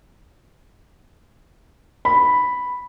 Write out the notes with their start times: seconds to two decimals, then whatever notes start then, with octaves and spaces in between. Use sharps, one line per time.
2.05 B5